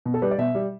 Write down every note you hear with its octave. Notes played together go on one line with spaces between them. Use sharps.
B2
A4
G3 B4
D5
B2 E5
G3